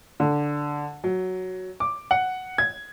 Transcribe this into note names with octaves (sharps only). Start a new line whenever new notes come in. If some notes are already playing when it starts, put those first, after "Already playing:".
D3
F#3
D6
F#5
G#6